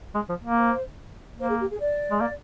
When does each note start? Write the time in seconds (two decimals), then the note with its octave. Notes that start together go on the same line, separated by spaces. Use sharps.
0.15 G#3
0.29 F3
0.43 A#3
0.56 C5
1.39 A#3 C5
1.49 G#4
1.60 G4
1.70 G#4
1.81 D5
2.11 G#3
2.21 A#3